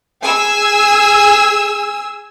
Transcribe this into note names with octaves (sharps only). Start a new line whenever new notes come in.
G#4 G#5 E6